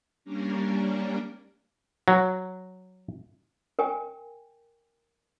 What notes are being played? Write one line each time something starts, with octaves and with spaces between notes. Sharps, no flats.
G3 A#3 C#4 D4 A#4
F#3
A#4 G5 G#5